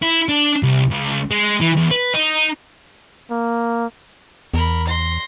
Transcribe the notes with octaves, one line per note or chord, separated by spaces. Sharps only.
E4
D4
C2
C#2
G#3
E3
E2
B4
D#4
A#3
E2 A#4 B5
C6 A#6